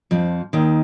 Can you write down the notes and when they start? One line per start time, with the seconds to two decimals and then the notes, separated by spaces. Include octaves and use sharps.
0.11 F2 F3
0.53 D#2 D#3